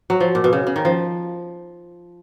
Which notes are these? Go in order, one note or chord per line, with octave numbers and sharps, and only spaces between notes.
F#3
F3
A#2
B2
C#3
C#3
D#3
F3